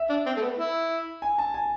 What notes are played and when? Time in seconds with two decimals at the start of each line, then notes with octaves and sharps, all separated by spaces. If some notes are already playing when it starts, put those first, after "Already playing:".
Already playing: E5
0.10 D4
0.26 C4
0.37 A3
0.42 B3
0.58 E4
1.22 G#5
1.38 A5
1.54 G#5